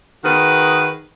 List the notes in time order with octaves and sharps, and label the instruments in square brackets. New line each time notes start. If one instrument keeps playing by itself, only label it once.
[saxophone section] D#3 F#4 G#4 B4